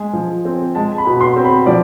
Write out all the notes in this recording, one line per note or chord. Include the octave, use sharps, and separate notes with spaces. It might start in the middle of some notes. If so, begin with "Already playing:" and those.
Already playing: G#3 G#5
F3
C4
G#3 A5
B5
B2
C6
C4
B5
F3 D5